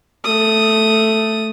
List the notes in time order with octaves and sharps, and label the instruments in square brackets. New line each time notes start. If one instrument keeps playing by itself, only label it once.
[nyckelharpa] A3 D#6